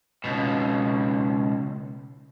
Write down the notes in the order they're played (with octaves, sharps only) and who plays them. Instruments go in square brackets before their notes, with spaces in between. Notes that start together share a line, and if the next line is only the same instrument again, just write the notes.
[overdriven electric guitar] C#2 B2